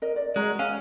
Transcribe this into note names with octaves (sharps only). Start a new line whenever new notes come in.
A#4 D#5
D5
G#3 F#4 A#5
C#4 F5